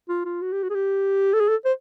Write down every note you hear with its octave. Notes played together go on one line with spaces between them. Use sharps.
F4
F4
F#4
G4
F#4
G#4
G4
A4
G#4
A4
C5